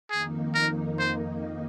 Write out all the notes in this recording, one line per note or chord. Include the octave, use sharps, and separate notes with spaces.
F2 D#3 A#3 D#4 G#4
A#4
C5